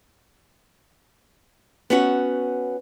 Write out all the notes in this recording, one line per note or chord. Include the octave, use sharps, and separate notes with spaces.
B3 C#4 F#4